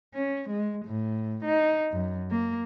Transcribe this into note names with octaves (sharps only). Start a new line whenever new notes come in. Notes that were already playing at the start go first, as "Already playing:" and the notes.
C#4
G#3
A2
D#4
F#2
A#3